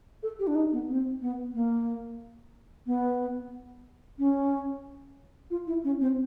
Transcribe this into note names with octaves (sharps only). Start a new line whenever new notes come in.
A4
G4
D4
D#4
B3
C4
B3
A#3
B3
C#4
F4
E4
C#4
C4